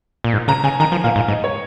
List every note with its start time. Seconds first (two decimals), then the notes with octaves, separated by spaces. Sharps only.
0.24 A#2
0.33 G#2
0.48 C#3 A#5
0.64 C#3 G#5
0.80 D#3 A#5
0.92 F3
1.04 A#2 F5
1.16 G#2
1.28 G#2 D#5
1.44 C#5